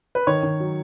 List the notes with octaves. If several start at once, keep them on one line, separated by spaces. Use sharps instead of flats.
B4
D#3 C#5
D#3
F#3